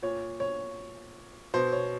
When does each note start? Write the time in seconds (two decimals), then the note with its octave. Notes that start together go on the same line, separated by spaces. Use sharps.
0.02 A#2 C#5
0.40 C#5
1.54 B2 C5
1.73 C#5